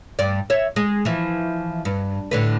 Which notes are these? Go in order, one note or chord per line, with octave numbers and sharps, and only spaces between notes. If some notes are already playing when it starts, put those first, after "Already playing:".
G2 D5
C#5 E5
G#3
E3 F3
G2
A2 D3 B4